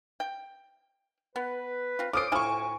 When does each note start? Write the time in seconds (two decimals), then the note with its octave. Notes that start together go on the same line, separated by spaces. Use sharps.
0.20 G5
1.36 B3 B4
1.99 C4 F4
2.13 C#4 F4 A4 C5 D6 D#6 D7
2.32 D2 A2 E4 F4 C5 G#5 C#6